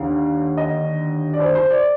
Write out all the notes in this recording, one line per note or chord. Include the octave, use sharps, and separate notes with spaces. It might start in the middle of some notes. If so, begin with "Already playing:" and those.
Already playing: D#2 D3 F5
D#5
D5
C5
C5
D5